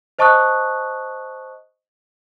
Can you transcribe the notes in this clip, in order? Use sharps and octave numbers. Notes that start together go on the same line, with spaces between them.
C5 D#5 A5 C#6 D#6 F#6